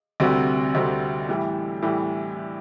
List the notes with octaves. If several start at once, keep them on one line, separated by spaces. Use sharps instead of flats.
D2 C3 G3 C4 F#4
D2 C3 G3 C4 F#4
A2 E3 G3
A2 E3 G3